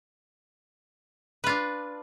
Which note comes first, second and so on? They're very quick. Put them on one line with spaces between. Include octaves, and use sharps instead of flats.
B4 F4 D4